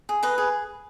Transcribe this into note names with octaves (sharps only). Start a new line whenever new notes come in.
G#4
B4 D#5
G#4